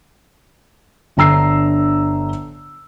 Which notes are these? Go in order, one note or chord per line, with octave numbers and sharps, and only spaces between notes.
G1 D3 A#5 E6 C7